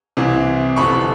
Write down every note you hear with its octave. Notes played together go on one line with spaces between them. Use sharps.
C2 C3 E3
G1 F2 C3 B5 C#6